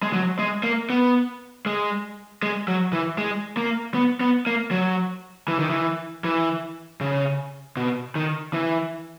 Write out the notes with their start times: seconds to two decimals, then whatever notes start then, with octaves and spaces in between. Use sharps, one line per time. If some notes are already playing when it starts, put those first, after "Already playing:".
0.02 G#3
0.13 F#3
0.39 G#3
0.63 A#3
0.90 B3
1.66 G#3
2.43 G#3
2.68 F#3
2.93 E3
3.18 G#3
3.57 A#3
3.94 B3
4.20 B3
4.46 A#3
4.71 F#3
5.48 E3
5.59 D#3
5.70 E3
6.24 E3
7.01 C#3
7.77 B2
8.15 D#3
8.53 E3